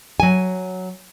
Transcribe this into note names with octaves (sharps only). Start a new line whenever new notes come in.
F#3 G#5